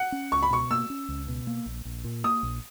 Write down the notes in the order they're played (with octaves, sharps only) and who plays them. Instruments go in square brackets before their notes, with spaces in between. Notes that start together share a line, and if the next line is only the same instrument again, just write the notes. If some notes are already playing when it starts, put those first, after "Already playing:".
Already playing: [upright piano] F#5
[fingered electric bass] C#4
[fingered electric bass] C#2 [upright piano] C#6
[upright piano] B5
[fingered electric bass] B2 [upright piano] C#6
[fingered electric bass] A#3 [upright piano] E6
[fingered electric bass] C#4
C#2
B2
A#3
A#1
A#1
A#2
[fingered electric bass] A#3 [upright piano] D#6
[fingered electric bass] A#1